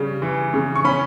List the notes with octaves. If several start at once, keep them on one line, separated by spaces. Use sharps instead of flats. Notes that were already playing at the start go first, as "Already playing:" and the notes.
Already playing: C#3 G3
E3
C#3
C#6
C#4 B5